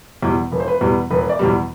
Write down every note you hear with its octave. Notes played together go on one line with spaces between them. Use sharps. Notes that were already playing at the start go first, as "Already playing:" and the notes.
E2 B2 G3
E1 B4
C5
B4
E2 B2 G3
E1 B4
D5
E2 B2 G3